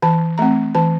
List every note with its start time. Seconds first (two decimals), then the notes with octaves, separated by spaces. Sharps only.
0.02 E3 A5
0.38 A3 C4 A#5
0.75 E3 A5